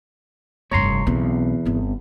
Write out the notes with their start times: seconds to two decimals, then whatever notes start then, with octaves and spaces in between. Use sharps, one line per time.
0.71 F1 G2 C#5 A#5 C6
1.07 B1 E2 C4
1.65 G1 C4